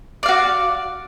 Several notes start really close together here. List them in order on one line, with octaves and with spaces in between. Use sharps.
D5 F5 F#4